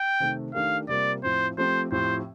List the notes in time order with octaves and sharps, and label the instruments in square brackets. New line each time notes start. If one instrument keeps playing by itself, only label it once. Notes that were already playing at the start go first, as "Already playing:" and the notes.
Already playing: [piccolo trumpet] G5
[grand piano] C3 D#3 A3
[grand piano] D#3 A3 D4 G4 A#4 [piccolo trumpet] F5
[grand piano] C3 G3 A#3 F4 [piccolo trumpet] D5
[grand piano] A2 F3 C4 [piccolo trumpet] C5
[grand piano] F3 A3 C4 G4 [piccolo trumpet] C5
[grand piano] A2 F3 C4 G4 [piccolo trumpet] C5